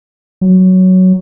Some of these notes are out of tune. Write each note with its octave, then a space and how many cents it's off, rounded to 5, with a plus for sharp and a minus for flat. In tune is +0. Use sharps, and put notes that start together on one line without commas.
F#3 +5